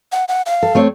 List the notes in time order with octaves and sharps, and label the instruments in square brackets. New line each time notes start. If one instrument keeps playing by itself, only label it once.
[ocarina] F#5
F#5
F5
[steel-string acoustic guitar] A4
A3 C4 C#5